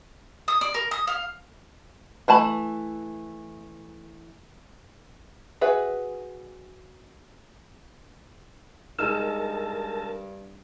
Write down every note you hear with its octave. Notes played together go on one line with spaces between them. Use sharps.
D#6
D5
A#4
D#6
F5
E3 A3 A5 B5
F#4 G#4 B4 E5
G2 G#3 D#4 A#4 A5 E6